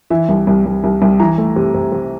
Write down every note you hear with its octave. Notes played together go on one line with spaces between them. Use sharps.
E3 E5
C2
C2
C2
C2
C2
E3 A#5
A3
C3
C3
C3